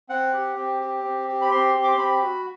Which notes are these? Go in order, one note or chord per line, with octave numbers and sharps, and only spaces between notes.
C4 F#5
G4
C4
G4
C4
G4
B5
C4 C6
G4
D6
C6
C4 B5
F#4